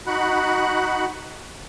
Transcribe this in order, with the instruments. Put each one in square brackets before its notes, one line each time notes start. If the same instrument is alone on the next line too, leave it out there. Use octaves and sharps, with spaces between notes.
[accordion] D#4 F#4 F#5 B5 F#6